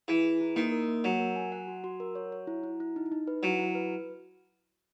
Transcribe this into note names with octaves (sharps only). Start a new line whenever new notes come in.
E3 G#4
G#4
E4
D#3 A#3
A#4
A#3
F#3 C#5
A#4
G#5
F#5
F#4
F#4
A#4
C#5
C#5
E4
E4
E4
D#4
D#4
B4
F#3 E4
E4
B4